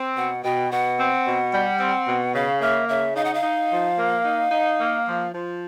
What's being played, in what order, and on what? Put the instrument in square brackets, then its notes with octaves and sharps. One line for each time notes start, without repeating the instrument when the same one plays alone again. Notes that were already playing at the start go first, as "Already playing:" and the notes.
Already playing: [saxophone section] C4
[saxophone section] B2 [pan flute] F#5
[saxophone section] B2 [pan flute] G5
[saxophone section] B2 [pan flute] F#5
[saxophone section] C4
B2
G3
C4
B2
[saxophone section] C#3 [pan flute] F5
[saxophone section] A#3 [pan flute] E5
[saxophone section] C#3 [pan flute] E5
[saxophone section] D#4 [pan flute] F5
[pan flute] F#5
F5
[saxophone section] D#4
F3
A#3
D#4
D#4
A#3
F3
F3